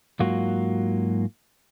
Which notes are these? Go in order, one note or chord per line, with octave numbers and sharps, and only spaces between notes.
G#2 F#3 A#3 F4 F#4